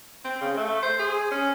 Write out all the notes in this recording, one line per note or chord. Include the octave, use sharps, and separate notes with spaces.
C4
C#3
A3
C5
G#4
C#4